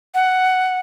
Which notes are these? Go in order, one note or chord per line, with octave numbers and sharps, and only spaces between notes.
F#5